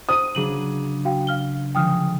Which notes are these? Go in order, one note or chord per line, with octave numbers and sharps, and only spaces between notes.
C5 D#6 D#7
C#3 F#3 D4 G#4 D#7 F#7
F#4 F5 G5
F5 F6 G7
D3 F3 G#3 G5 D#6 F6